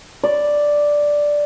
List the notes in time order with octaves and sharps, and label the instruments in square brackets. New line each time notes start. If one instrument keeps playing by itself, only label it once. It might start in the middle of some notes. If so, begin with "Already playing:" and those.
[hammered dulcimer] D5